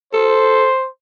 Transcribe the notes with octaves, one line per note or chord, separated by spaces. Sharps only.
A4 C5